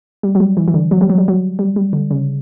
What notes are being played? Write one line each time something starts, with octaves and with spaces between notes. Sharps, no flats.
G3
F#3
G3
E3
E3
D3
F#3
G3
F#3
G3
F#3
G3
G3
D3
C#3